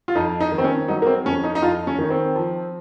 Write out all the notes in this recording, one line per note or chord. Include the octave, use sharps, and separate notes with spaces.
F4
F2 D#4
D#4
D#3
C4
C#4
F#3 D#4
A#3
C4
F2 C#4
D#4
D#4
F2 F4
C#4
D#3
C4
F3